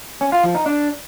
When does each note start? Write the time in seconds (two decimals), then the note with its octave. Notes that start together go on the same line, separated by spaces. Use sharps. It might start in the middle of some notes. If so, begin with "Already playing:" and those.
0.21 C#4
0.32 F4
0.43 F3
0.55 D#4
0.66 D4